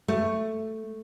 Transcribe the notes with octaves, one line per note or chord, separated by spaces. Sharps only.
A3